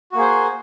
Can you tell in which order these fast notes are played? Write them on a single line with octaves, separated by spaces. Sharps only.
F#4 A#3 G#4 C5